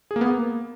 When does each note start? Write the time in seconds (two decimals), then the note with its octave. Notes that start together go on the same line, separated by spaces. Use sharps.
0.11 G#4
0.16 A#3
0.21 B3
0.26 A#3